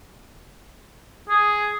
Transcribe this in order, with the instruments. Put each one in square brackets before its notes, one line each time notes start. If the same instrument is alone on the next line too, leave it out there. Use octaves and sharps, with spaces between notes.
[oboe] G#4